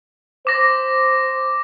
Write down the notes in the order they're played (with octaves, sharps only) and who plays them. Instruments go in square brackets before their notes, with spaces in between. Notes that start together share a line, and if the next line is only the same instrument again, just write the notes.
[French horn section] C5 [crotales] D6 A#6